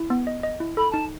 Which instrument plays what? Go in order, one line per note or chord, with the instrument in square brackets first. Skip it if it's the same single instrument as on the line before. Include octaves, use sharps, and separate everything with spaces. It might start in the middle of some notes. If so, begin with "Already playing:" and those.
Already playing: [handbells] E4
B3
D#5
D#5
E4
[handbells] A4 [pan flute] B5
[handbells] D#4 [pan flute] A5